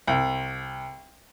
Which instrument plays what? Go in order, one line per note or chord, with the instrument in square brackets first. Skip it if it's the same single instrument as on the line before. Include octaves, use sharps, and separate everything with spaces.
[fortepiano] C2